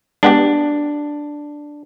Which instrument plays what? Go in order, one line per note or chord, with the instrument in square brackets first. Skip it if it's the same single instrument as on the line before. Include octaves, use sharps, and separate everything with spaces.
[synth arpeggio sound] G#3 B3 G4 [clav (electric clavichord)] D4